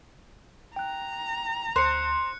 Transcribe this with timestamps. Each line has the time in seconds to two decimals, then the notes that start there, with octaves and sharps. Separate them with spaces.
0.76 G5 A#5 F#6
1.76 D2 C5 F#6 C#7